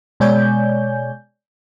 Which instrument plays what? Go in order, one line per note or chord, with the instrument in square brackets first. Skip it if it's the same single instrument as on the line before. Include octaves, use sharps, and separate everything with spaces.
[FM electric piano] B2 G#3 C#5 D5 G#5 G6